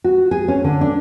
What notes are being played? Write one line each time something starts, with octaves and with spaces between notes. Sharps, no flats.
F#4
G#4
C#4
D3
D4